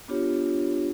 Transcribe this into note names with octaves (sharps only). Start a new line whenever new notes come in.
B3 D4 F4 G4 C#5